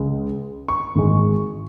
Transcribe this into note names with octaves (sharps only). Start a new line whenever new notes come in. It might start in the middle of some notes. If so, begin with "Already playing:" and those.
Already playing: C#2 C#3 G#3
C#6
G#1 G#2 G#3